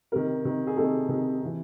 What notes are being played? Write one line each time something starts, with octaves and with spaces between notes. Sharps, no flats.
C3 D#3 A#4
C3 D#3
G#4
C3 D#3 A4
C3 D#3
C3 E3